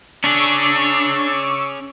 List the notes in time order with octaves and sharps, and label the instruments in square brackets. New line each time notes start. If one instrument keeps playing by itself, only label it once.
[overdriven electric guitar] C#4 G#4 [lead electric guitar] D4 [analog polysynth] C#6 D6 E6